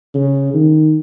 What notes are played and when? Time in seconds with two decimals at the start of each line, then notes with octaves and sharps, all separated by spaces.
0.14 C#3
0.54 D#3